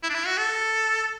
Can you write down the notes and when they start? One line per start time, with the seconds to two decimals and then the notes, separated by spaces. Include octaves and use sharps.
0.03 E4
0.10 D4
0.14 E4
0.26 F#4
0.38 A4